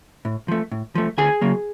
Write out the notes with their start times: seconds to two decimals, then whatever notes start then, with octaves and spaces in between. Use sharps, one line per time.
0.25 A2
0.48 F3 A3
0.72 A2
0.95 F3 A3
1.18 D2 G#4 G#5
1.41 C#3 F#3 A#3